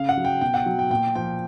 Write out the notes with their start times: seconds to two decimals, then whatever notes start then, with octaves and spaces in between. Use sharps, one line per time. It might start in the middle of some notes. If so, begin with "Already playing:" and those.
Already playing: C#3 F5
0.09 F#5
0.17 F#3
0.25 G5
0.41 B2 G5
0.54 F#5
0.66 F#3
0.79 G5
0.90 A#2 G5
1.15 F3 G5